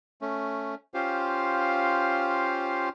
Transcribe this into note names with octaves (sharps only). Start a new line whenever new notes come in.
A3 C#4
C#4 F4 G4 C5 F5